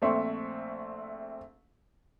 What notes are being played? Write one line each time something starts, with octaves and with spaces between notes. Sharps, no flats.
A#1 A3 C4 E5 C6 C#6